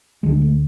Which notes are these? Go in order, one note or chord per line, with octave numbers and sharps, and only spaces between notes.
D2 D3 G#3
A3